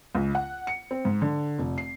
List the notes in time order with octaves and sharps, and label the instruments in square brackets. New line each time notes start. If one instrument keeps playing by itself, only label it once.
[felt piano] C#2
F#5
C#7
C4
G#2
D3
F1
C7